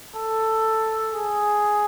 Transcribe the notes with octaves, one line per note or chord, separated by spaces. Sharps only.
A4
G#4